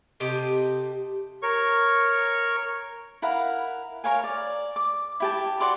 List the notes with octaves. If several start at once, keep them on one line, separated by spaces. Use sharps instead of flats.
C3 A3 G4 D#5
A#4 C#5 C#6
E4 A#4 F5 F#5
A#4 C#5 F5 G#5
D5
D6
E4 G4 A5
F#4 D5 C6 D6